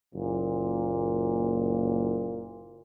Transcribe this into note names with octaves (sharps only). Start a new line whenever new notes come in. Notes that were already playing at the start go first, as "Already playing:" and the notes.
F#1 A#2